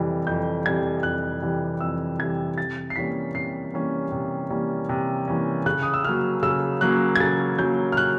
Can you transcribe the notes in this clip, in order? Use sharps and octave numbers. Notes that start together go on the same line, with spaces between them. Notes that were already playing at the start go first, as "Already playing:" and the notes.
Already playing: F2 C3 E3 G3
F2 G6
C3 E3 G3 G#6
F2 F#6
C3 E3 G3
F2 E6
C3 E3 G3 G#6
C3 A6
C7
E3 G3 A#3 C#4 B6
C3 C7
E3 G3 A#3 C#4
C3
E3 G3 A#3 C#4
C3
E3 G3 A#3 C#4
C#3 F#6
D#6
E6
F#3 A#3 C#4 F6
C#3 E6
F#3 A#3 C#4 F#6
G#6
C#3 A6
F#3 A#3 C#4 G6
F6
C#3 F#6